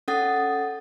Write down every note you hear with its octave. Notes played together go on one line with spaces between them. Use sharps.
C#4 A4 F#5 D#6 A6